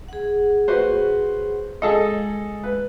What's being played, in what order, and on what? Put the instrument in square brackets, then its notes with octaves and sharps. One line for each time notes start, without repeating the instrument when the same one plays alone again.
[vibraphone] G#4 F#5
[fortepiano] F#4 B4 C5
[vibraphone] G#3 [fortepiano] G#4 A4 D#5
[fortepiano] B4